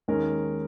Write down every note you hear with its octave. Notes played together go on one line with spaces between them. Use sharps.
D#2 D#3 G#3 C#4 A#4